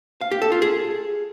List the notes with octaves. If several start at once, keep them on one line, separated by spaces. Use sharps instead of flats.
F5
G4
A4
F4
G#4